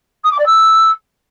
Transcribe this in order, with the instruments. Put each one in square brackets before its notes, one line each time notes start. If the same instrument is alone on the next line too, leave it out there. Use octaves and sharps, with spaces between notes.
[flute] D#6
D6
D5
E6